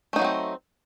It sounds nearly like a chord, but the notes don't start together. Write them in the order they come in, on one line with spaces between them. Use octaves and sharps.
A3 D#4 F#3 B3 C4